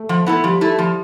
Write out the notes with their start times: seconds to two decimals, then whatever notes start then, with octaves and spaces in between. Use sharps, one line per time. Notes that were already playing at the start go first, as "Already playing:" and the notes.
Already playing: A3
0.09 F3
0.27 B3 E4 A4
0.43 F3 G3
0.61 A3 E4
0.79 F3